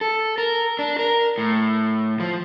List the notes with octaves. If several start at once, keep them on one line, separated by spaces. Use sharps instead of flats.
A4
A#4
D4
A#4
A2
F3